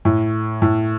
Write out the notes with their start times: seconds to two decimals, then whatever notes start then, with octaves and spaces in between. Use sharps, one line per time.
0.05 A2
0.62 A2